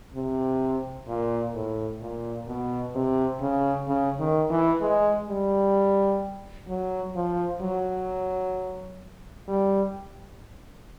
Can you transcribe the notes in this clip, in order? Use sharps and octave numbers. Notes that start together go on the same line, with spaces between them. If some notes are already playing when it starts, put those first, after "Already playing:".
C3
A#2
A2
A#2
B2
C3
C#3
C#3
D#3
E3
G#3
G3
F#3
F3
F#3
G3